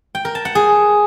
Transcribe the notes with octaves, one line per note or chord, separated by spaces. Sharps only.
G5
A#4
A5
F#5
G#4